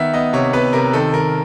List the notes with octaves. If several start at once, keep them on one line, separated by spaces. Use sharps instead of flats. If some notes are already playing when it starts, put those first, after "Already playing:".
Already playing: D#3 B3 E5 F#5
B3 D#5
C3 C#5
B3 B4
C3 A#4
D#3 A4
D#3 A#4